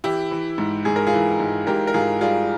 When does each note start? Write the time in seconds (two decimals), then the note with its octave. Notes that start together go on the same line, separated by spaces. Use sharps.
0.04 E3 E4 G4
0.31 E3
0.58 G#2
0.85 G#2 G#4
0.96 A#4
1.07 F4 G#4
1.13 E3
1.40 G#2
1.67 G#2 G4 A#4
1.87 A#4
1.94 G#2 F4 G#4
2.21 G3 F4 G#4